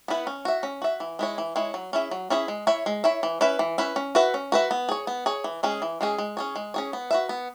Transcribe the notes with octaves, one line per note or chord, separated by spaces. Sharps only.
B3 E4 B4
C#4
F#4 E5
C#4
F#4 E5
E3
G#3 E4 C#5
E3
G#3 E4 C#5
F#3
C#4 E4 G#4 E5
F#3
C#4 E4 G#4 E5
G#3
E4 C#5 E5
G#3
E4 C#5 E5
E3
C#4 E4 B4 E5
E3
C#4 E4 B4 E5
C#4
F#4 B4 E5
C#4
F#4 B4 E5
B3
G#4 C#5
B3
G#4 C#5
E3
G#3 C#4 G#4
E3
G#3 C#4 G#4
G#3
C#4 G#4 C#5
G#3
C#4 G#4 C#5
B3
F#4 B4 E5
B3